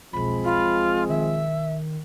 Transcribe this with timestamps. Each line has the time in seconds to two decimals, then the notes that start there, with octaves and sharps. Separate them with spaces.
0.13 E1 B1 F3 G#3 C4 B5
0.44 F4
1.09 D#3 E5